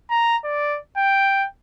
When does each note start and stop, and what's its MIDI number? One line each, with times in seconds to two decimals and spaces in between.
0.10 0.37 82
0.44 0.78 74
0.97 1.46 79